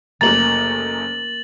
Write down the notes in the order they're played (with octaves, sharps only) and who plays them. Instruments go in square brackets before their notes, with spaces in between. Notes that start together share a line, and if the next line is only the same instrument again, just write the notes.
[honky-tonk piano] F#1 A3 A#5 [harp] A#3 [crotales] A6 F#7